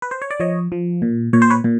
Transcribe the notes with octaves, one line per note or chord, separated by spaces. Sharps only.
B4
C5
C#5
D5
F3 C#5 D#5
F3
A#2
A#2 C#5
C5
B4 C#5
A#2